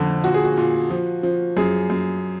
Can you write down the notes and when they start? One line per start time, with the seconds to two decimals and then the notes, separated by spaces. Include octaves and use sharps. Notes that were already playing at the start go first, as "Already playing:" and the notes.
Already playing: F2 D3
0.24 A#2 F#4
0.34 G#4
0.45 F#4
0.57 A#2
0.90 F3
1.23 F3
1.57 F#2 G#4
1.90 F#2